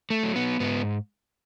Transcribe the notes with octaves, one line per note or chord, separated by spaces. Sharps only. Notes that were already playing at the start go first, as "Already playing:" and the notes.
A3
F#3
B3
G#2 B3